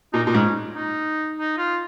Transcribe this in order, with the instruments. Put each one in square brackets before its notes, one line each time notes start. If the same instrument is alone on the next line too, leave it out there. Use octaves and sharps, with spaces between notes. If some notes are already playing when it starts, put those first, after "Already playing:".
[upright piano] A#2 [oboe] D#4
[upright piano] A#2 [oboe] D#4
[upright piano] G#2 [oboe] C#4
[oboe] D#4
D#4
F4